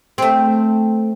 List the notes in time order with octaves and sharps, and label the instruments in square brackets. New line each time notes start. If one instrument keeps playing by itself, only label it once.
[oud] A3 C4